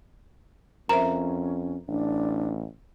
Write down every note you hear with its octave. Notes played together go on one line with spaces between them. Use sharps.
F2 C#4 A#4 C5 E5 A#5
A1 D4